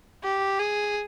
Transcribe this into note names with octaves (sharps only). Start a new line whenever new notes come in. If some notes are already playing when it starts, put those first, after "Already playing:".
G4
G#4